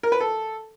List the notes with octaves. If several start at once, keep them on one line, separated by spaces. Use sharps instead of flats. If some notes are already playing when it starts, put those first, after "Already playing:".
A#4
B4
A4